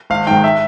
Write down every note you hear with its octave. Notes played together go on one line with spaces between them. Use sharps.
G#1 F5
G#2 D#3 G5
E5